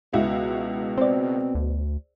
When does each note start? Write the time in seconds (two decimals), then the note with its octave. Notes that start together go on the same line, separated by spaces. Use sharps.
0.13 C#2 B2 E4 F#4
0.98 C4 C5 D5
1.55 D2